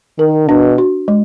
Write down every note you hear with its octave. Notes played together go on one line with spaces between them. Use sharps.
D#3 A#4
B2 D4
F#4
G#3